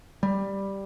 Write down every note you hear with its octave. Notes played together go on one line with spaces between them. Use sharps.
G3